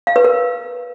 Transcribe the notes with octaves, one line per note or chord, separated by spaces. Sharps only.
F5
B4
A#4